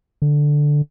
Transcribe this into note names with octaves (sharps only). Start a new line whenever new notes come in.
D3